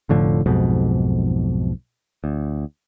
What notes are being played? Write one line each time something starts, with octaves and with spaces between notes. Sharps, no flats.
F1 A2 D3 F3
B1 F2 G#2 B2
D2